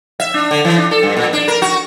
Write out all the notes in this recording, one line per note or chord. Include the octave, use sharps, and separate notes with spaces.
E5
D4
D3
E3
D4
A4
G2
A#2
D4
A#4
F#4